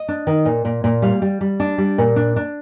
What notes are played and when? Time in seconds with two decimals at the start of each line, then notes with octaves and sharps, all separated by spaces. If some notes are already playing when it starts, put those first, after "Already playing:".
Already playing: D#5
0.08 D4
0.27 D#3
0.45 A#2
0.65 A#2
0.84 A#2
1.02 G3 F5
1.22 G3
1.41 G3
1.60 D4
1.78 G3
1.98 A#2
2.16 D4
2.36 D4